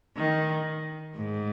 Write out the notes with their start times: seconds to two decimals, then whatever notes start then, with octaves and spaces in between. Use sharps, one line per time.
0.17 D#3
1.16 G#2